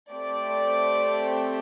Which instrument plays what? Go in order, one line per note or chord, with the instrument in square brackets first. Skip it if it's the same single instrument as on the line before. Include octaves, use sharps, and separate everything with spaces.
[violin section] A3 C4 G4 D5